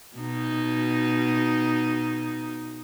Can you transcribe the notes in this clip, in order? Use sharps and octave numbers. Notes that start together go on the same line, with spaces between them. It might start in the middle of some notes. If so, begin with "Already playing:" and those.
B2 D#4